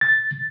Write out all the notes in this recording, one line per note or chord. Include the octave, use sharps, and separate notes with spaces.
A6